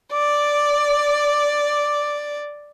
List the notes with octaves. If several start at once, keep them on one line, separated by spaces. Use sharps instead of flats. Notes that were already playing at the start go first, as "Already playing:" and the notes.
D5 D6